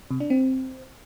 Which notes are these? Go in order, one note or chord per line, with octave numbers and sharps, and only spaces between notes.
C3
D4
C4